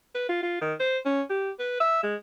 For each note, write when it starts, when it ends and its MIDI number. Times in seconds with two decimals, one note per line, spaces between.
0.15 0.28 71
0.29 0.39 65
0.43 0.57 65
0.61 0.74 51
0.80 0.98 72
1.06 1.22 61
1.30 1.51 67
1.59 1.79 71
1.80 2.00 76
2.04 2.16 56